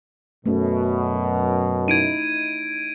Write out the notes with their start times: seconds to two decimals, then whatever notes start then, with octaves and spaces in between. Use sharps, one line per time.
0.46 F#2 B2 A3 C#4
1.88 D#4 E4 G#6 D7 D#7